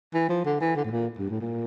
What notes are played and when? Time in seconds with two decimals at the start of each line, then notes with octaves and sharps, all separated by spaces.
0.14 E3
0.29 F3
0.45 D3
0.61 E3
0.76 D3
0.85 A2
0.91 A#2
1.18 G2
1.30 A2
1.40 A#2